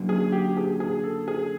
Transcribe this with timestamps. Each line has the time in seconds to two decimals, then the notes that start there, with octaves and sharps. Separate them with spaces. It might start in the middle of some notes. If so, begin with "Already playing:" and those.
Already playing: F#2 D3 F#3 A#3
0.09 G#4
0.32 G4
0.57 G#4
0.80 G#4
1.04 A4
1.28 G#4